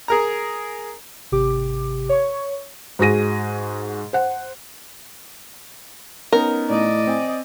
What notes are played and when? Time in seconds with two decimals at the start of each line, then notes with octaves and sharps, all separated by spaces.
0.08 G#4 A#4 A#5
1.32 G#1 C3 G4 D6
2.09 C#5 C#6
2.99 G#2 F#4 G#4 A#6 D#7
4.13 C5 F#5
6.32 B3 C#4 D#4 A#4
6.70 A2 D5 D#5
7.07 C4 G#5